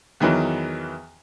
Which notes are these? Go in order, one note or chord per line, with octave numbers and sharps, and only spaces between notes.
E2 D#3 E3 F#3